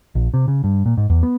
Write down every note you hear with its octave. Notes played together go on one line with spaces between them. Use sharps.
A#1
C3
C#3
G2
A#2
G#2
E2
B3